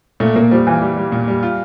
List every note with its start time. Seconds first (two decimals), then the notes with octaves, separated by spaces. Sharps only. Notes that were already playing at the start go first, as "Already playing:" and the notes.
0.20 A#2 A3
0.36 A#2 A#3
0.51 F3 G3
0.67 E3 F4
0.82 G3
0.97 G3
1.12 A#2
1.28 G3
1.43 F4